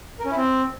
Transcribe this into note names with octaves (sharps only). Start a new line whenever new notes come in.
A#4
C#4
E4
C4